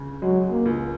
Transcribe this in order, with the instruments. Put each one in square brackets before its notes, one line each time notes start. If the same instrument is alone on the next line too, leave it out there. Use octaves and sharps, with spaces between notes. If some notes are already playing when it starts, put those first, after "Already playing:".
Already playing: [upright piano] C#2 C#3
[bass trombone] F#3 [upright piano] G#3
[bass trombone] A#3
[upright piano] C#2